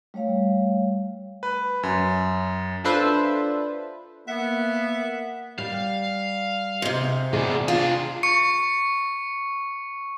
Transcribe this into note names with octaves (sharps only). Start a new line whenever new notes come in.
G3 A3 C#5 F5
B4
F#2
D4 F4 A4 B4 C5 E5
A#3 B3 E5 F#5
G3 F5
G#2 C3
D#2 B2 G#4 D5
C3 D4 F4
C#6 C#7